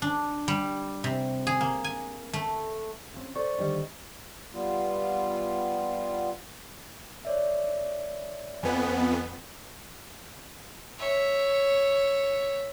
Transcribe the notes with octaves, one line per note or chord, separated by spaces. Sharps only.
D4
G3
C3
G#4
A#3
G#5
A3
C#3 C4
A4 C5 D5 C#6
D3 D#3 G3
G3 B3 F4
C#5 D5 E5
F2 B3 G#5 G#6
C#5 E5